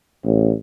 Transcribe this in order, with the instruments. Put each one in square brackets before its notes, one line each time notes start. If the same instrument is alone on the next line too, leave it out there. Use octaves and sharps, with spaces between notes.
[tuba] A1